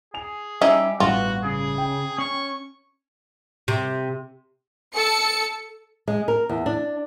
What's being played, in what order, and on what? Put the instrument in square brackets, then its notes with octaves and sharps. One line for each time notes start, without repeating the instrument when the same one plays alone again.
[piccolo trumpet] G#4 [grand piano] G#5 F7
[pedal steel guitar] G3 G4 [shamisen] C#4 D#4 E4
[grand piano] A1 G2 [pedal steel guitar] B3 [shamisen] F4 [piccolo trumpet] F#4
[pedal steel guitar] C#3 [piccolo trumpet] G#4
[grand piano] G5
[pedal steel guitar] C#4 C#5 [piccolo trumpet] C#6
[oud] C3
[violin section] A4 C#7
[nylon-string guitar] G#3
A#4
E2
D4